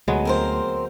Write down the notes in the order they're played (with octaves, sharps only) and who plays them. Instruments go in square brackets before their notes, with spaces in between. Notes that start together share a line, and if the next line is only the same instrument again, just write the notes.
[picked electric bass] D2 [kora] F#3 G#3 B3
[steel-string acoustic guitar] C4 A#4 C5